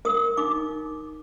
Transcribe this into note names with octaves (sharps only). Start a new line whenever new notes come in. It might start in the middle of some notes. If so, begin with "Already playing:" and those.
A#4 D#6
D#4 D6